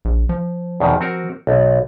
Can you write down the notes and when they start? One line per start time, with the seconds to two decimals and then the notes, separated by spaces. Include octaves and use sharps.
0.05 A#1
0.29 F3
0.80 E2 B2 D#3
1.01 C4 F#4 A#4
1.47 B1